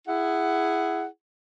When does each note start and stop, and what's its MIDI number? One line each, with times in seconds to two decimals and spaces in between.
0.06 1.04 64
0.06 1.04 68
0.06 1.04 78